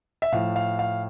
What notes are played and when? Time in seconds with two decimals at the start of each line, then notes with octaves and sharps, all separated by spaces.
0.22 E5
0.32 A2 F3 F5
0.56 F5
0.79 F5